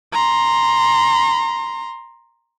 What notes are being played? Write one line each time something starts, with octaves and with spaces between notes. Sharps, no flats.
A#5 C6